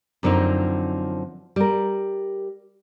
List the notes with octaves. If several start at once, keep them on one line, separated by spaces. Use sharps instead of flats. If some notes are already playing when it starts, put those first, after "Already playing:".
F#2 D3 F3 C4 D#4
G3 A#4